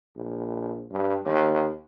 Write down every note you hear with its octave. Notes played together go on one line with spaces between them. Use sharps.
A#1
G2
D#2